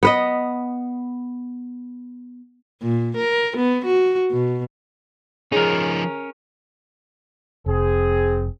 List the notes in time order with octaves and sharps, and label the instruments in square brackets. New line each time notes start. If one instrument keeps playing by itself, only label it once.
[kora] B3 B4 D#5
[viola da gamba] A#2
A#4
B3
F#4
B2
[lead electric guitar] F3 D#4 [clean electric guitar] C#4 A#4 [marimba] G#4
[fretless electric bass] F1 [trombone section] C4 G#4